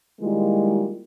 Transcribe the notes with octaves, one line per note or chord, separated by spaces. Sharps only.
D#3 G3 G#3 A#3 E4 F4